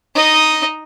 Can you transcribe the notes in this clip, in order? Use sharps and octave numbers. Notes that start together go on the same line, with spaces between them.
D#4 D#5